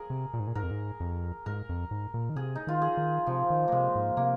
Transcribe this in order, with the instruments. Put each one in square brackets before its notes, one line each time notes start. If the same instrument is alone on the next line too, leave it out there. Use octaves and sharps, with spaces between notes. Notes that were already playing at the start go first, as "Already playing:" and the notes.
Already playing: [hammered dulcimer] G#4 A#4
[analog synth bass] C3
A#2
G#2
A#2
[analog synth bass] G#2 [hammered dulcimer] A#4
[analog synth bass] F2
G#2
F2
[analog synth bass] G#2 [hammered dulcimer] A#4
[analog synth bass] F2
G#2
A#2
D#3
[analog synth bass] C3 [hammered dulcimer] G#4
[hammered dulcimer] D#4
[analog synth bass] D#3 [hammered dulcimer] F4
[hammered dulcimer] G#4
[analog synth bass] D#3
[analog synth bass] C3 [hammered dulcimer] F3
[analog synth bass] D#3
[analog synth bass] C3 [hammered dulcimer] G#3 A#3
[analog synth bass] G#2
[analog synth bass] C3 [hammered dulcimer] A#3